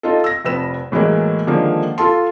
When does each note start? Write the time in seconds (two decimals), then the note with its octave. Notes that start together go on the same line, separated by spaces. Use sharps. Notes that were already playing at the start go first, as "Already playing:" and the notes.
0.03 D#4 F4 A4
0.24 E6 A#6
0.45 F1 F2 B4 E6 E7
0.92 A2 E3 F#3 G#3 A#3
1.47 D3 D#3 F3 G#3 A#3
1.98 F4 A4 A5 C6